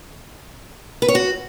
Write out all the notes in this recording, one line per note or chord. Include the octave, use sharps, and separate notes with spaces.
B4
C#5
F#4